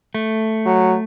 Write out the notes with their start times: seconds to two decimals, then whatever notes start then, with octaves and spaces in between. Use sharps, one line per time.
0.15 A3
0.66 F#3